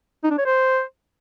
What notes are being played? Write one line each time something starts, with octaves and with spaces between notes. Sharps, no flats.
D#4
D4
C#5
C5